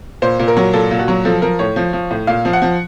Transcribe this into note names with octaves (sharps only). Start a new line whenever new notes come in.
A#2 C5
A#2
A#4
F#3
A#2 A4
A#2
F#4
F#3
F3 A4
F3 A#4
A2 C#5
F3
F3
A2
A#2 F5
F3
F#5
F3